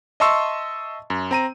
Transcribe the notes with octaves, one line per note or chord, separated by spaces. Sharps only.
D#5 E5 A5 C6 C#6 E6
F#2
C4 A#5 D#7